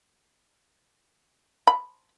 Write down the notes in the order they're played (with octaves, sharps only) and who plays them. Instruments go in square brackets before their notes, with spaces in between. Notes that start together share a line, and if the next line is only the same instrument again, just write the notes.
[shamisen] B5